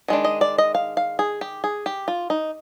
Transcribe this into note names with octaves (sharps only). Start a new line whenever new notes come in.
D#3 G#3 D4
D#5
D5
D#5
F5
F5
G#4
G4
G#4
G4
F4
D#4